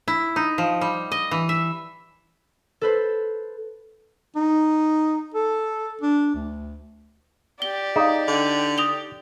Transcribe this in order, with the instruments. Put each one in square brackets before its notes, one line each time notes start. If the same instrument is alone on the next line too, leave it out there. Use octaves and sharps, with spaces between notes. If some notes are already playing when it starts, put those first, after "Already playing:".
[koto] E4
D#4
F3
G3
D#5
E3
E5
[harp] A4 B4 C5
[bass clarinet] D#4
A4
D4
D2
[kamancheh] G4 D5 [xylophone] G7
[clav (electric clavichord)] D#4 [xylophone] G#4 F5
[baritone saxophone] D3
[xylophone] D#6 F7 G7